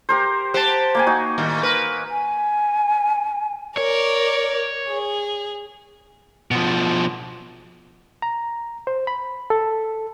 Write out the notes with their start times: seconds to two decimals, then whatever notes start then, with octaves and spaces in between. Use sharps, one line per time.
0.09 G4 A#4 C5
0.54 G4 C5 F#5 A5
0.95 A#3 G5 G#5
1.07 D#4 F#4
1.38 A2 D#3 G3
1.63 A#4 B4
2.09 G#5
3.77 A#4 C#5 D5
4.89 G#4
6.51 B2 F3
8.22 A#5
8.87 C5
9.07 B5
9.50 A4